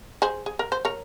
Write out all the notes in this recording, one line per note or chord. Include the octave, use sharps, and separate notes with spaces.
G#4 C5
G#4
A#4
C5
A#4 C#5